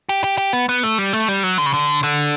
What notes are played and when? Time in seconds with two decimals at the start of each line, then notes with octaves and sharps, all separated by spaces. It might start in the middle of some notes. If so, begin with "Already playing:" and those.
0.09 G4
0.24 G4
0.38 G4
0.53 B3
0.69 B3
0.83 A3
0.98 G3
1.13 A3
1.28 G3
1.43 F#3
1.58 D3
1.66 C#3
1.73 D3
2.03 D3